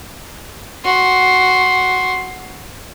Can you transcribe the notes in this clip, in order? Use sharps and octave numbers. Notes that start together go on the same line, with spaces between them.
F#4 C6